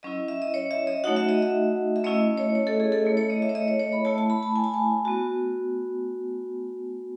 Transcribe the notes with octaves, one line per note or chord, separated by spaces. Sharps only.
F#3 C#4 E4 D#5
E5
D#5
C#5
E5
D#5
A3 D#4 F#4 F#5
E5
D#5
E5
E5
A3 C#4 E4 D#5
C#5
C#5
A4
G#4
A4
A3 E4
C#5
D#5
E5
C#5
D#5
C#5
C#5
B5
A3 E4 A5
A5
B5
A5
G#5
A5
G#5
B3 F#4